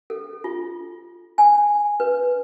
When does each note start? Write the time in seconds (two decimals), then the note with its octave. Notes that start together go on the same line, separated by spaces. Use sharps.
0.10 A4
0.44 F4
1.38 G#5
2.00 B4